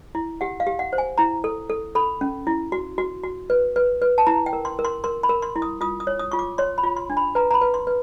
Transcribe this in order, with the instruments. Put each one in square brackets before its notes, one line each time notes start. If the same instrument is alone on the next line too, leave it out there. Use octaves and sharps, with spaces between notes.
[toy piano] E4
G4 F#5
F5
G4
F#5
C5
G#5
E4 A#5
A4
A4
A4 B5
C#4
E4
F#4
F#4
F#4
B4
B4
B4
A5
E4 A#5
G5
A#4
C6
A#4
C6
A#4 C6
B5
A#4
C6
E4
D#6
F4 D#6
D#6
C#5
D#6
F4 C#6
D6
C#5 C6
B5
F4
C6
D4
B5
B4 A#5
A#5
B5
B4
C6
B4